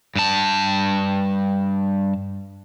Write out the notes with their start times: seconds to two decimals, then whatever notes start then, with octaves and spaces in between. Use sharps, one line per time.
0.16 G2 A5